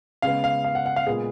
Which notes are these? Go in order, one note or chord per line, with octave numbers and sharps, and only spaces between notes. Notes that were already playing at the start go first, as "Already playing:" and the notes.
C#3 G#3 B3 F5
F5
F5
F#5
F#5
F5
A#2 G#3 B3 G#4